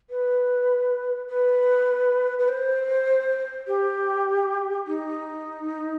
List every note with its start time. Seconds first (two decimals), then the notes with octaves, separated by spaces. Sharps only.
0.10 B4
1.29 B4
2.39 B4
2.49 C5
3.67 G4
4.87 D#4